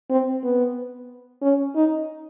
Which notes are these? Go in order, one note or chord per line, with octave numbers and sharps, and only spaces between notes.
C4
B3
C#4
D#4